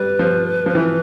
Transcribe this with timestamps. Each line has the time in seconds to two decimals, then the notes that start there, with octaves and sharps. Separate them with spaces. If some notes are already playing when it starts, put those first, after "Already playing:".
Already playing: G3 B4
0.19 F3
0.66 F3
0.75 E3